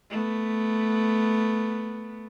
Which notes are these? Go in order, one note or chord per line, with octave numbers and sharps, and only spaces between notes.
A3 B3